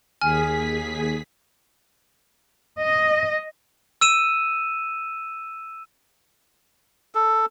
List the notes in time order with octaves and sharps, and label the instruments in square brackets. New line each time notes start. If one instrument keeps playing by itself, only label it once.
[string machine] D#2 G#4 B6 [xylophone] G#5 F6
[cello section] D#5
[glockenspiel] E6 D#7 E7
[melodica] A4